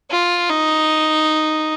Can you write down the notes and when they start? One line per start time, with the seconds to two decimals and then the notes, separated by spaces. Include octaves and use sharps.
0.11 F4
0.50 D#4